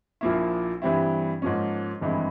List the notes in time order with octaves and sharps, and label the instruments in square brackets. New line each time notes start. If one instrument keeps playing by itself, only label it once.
[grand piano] A#1 A#2 F3 A#3 E4
G2 E3 G3 C4 E4
G#2 F3 A#3 C#4
G#1 G2 E3 G#3 C4